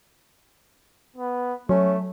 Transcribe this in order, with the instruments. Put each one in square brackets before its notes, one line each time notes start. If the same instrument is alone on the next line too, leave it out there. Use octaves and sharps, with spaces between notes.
[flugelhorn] B3
[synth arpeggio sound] F#3 [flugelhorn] A3 [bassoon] C#4